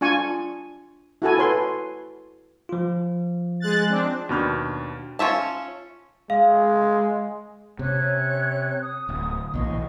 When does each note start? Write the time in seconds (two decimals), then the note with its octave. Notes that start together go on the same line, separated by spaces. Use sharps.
0.01 D4 F4 G#5 C#6
1.22 E4 F#4 A4 G#5
1.38 A4 B4 C#5 C6
2.69 F3 F4
3.60 G#3 F#6 A6
3.89 C4 D4
4.29 D#2 B2 D4 B5 F6 G6
5.19 C#4 F4 E5 A5
6.30 G#3 F5
7.79 C3 C#4 C#5 F#6
8.81 D#6
9.09 D1
9.54 B1 A#2 E3 D#5 C6 C#6